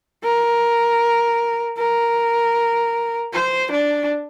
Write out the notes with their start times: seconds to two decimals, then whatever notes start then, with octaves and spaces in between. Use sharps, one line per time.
0.24 A#4
1.78 A#4
3.33 C5
3.72 D4